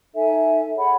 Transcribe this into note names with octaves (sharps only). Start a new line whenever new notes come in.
D#4 A4 E5 G#5
G#4 C#5 F#5 B5